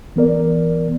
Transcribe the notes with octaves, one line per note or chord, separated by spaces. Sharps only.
E3 B3 A#4 D5